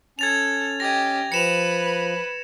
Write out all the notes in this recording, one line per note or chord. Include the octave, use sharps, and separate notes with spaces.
C#4 A4 G#6 A6 F7
G4 D#5 G#6 A#6
F3 B4 C#7 E7 F7